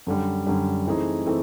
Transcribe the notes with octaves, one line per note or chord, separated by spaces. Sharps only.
F#2 D3 G3
F#2 D3 G3
E3 A3 C4 D#4 G#4
E3 A3 C4